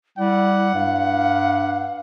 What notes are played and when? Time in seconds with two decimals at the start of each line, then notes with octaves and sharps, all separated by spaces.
0.18 G3 E4 F#5
0.74 G2 F5